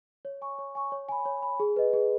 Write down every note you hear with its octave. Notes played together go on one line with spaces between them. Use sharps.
C#5
G#5 C#6
C#5
G#5 C#6
C#5
G#5 B5
C#5
G#5 B5
G#4
B4 D#5
G#4